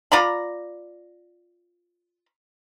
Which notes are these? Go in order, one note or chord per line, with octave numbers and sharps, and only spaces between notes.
F4 D5 A#5 B5